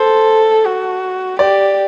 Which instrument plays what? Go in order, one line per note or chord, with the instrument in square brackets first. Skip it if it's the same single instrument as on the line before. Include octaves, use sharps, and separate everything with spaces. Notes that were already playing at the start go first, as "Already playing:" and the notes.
Already playing: [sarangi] A4 [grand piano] C5
[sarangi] F#4
[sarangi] G4 [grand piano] D5